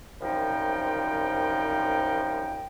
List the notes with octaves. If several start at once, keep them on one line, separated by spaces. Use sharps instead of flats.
C2 F#2 F3 D#4 G5